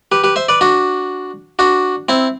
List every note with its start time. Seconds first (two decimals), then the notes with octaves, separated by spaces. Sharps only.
0.12 G4 B4
0.24 G4 B4
0.36 C5 E5
0.49 B4 D5
0.61 D4 F#4
1.59 D4 F#4
2.09 C4 E4